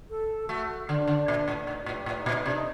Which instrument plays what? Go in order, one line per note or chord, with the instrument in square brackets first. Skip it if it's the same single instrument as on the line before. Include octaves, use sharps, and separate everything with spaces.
[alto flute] A4
[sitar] A3 [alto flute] F#4
[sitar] D3 [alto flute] D4
[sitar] D3
A#2
A2
[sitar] A2 [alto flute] D#4
[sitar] A2 [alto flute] F#4
[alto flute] G4
[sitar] A2
[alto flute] D#4
[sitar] A#2
[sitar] C3 [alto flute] D4
[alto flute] D#4